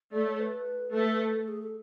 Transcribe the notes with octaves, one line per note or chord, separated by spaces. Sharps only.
A3 D5
C#5
B4
A3
A4
G#4
A4